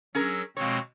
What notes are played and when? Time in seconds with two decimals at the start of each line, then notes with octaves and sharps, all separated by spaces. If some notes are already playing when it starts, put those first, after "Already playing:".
0.15 F#3 C#4 G#4 A#4 E6
0.57 F2 B2 G#3 C4 C#5